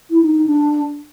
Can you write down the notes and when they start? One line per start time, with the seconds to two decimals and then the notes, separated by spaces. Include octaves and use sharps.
0.10 E4
0.22 D#4
0.34 D#4
0.46 D4